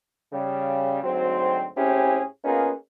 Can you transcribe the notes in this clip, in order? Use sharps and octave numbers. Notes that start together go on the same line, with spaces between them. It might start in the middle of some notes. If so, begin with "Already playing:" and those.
C#3 G3
D2 G#2 F#3 C4
A2 C4 C#4 E4 G4 G#4
A#3 B3 C#4 D#4 F4 G#4